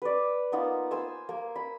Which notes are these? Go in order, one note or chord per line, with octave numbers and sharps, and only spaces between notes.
B4 D5
A#3 B3 D#4 F4
C5 G#5 E6
A#3
B5